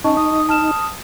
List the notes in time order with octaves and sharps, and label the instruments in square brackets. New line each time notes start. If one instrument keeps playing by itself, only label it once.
[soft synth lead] C#4 [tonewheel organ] D#4 [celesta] D#5 A5 C#6
[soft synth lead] D#6
[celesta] A5 F6 E7